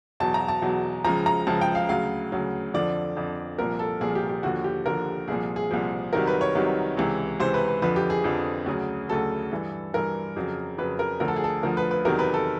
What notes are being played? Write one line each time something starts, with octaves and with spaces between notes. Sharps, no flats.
E2 B2 F#3 A5
A#5
A5
E2 B2 F#3
C#2 C#3 F3 A#5
A#5
C#2 C#3 F3 A5
G5
F5
D2 C#3 F#3 F5
D2 C#3 F#3
F2 D3 F3 D5
F2 D3 F3
C2 A#2 F3 A#4
A4
C2 A#2 F3 G#4
G4
G4
D#2 D3 F3 F#4
G4
D#2 D3 F3 A#4
C2 A#2 F3 G#4
G#4
C2 A#2 F3
C2 C3 D#3 F#3 A#4
B4
C#5
C2 C3 D#3 F#3
C#2 C3 E3
C#2 C3 E3 C5
B4
B4
F2 D3 F3 B4
G4
G#4
F2 D3 F3
D2 C#3 F#3
D2 C#3 F#3 A4
G2 E3
G2 E3 A#4
F2 C#3 F#3
F2 C#3 F#3 B4
A#4
D2 D3 F3 A#4
A4
G#4
A4
D2 D3 F3 A#4
B4
B4
E2 C3 D#3 F#3 A#4
B4
A4